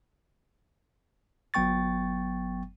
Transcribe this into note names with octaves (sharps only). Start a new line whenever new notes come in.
G1 F#3 B3 G5 C#6 A6